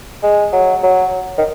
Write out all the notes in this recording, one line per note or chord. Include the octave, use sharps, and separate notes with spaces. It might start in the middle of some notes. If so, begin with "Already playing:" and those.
G#3
F#3
F#3
D#3